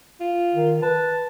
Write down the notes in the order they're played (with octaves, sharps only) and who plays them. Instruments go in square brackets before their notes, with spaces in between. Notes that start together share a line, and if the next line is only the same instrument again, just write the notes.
[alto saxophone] F4
[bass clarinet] D#3
[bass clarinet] B4 [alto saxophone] A5